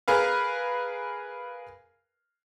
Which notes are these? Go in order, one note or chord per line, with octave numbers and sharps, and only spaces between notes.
G#4 A#4 B4 F5